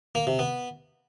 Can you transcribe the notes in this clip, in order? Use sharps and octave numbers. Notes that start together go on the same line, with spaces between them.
A#3
C3
B3